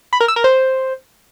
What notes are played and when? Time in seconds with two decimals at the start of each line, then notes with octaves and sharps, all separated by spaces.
0.13 B5
0.21 A#4
0.28 E6
0.36 A#4
0.44 C5